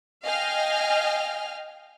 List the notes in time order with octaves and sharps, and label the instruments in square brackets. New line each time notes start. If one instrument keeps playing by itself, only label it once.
[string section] D#5 F5 G5 G#5 F6